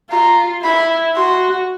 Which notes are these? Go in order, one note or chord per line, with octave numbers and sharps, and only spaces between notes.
F4 A#5
E4 B5
F#4 C6